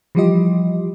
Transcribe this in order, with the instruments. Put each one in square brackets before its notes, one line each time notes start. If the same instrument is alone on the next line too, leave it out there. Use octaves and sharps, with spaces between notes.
[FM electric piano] E3 F3 G3 F4 G4 D#5